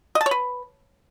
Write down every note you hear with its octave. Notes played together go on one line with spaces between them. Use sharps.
D#5
A5
C#5
B4